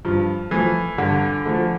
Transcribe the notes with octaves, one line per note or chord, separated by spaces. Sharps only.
G2 F3
E3 F3 A3
G2 D3
F3 A3